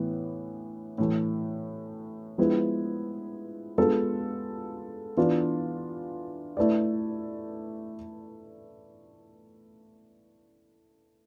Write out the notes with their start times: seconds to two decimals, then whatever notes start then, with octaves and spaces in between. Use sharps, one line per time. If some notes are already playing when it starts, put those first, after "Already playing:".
Already playing: A2 E3 B3
0.98 A2 E3 A3
2.38 F3 G#3 B3 E4 B4
3.78 G#3 B3 F4 A4
5.17 E3 B3 D4 F4
6.57 A3 E4 B4 D5